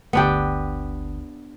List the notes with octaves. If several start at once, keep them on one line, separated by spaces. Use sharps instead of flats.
G1 D2 B3 D4 G4